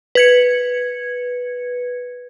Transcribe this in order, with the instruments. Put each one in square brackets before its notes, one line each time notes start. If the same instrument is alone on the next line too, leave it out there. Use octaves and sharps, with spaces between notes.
[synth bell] B4 G#6 C#7